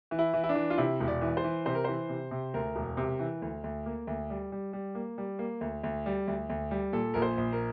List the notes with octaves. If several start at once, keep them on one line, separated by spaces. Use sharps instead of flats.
E3
E4
E3
E4
D4
E3
F4
C3 E4
E1
D5
E3
C5
E3
C3 C5
A#4
E3 C5
C3
C3
D2 A#4
E1
C3
E3
D2
D2
A#3
D2
G3
G3
G3
A#3
G3
A#3
D2
D2
G3
D2
D2
G3
A#2 A4
A#1 A#4
C5
A#1
A#4